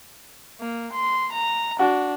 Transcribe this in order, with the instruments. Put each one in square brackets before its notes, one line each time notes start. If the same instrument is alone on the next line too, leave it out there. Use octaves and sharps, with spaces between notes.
[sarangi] A#3
C6
A#5
[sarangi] D4 [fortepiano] F#4